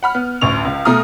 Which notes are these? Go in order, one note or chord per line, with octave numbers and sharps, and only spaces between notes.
F#5 B5 F6
B3
A1 D2 C#6 F7
C#2
B2 A3 A#5 D#6 F6